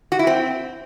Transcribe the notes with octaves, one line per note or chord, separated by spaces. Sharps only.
F#4
E4
C4